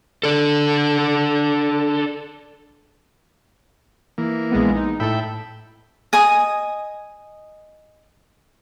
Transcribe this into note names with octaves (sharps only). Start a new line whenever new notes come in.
D4 A4
E3 A#3
A#1 G#3 B3
D#4
A2 A4 E5 G5 B5
D#5 G#5 D#6